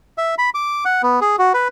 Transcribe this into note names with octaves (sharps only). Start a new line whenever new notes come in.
E5
B5
D6
F#5
B3
G#4
F#4
B4